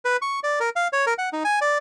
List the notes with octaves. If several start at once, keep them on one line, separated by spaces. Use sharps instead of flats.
B4
C#6
D5
A#4
F5
C#5
A#4
F#5
D#4
G#5
D5